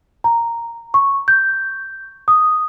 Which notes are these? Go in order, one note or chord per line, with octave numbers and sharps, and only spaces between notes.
A#5
C#6
G6
D#6